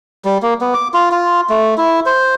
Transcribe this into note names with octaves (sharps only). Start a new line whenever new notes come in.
G3
A#3
B3
D6
F4
F4
A3
E4
C5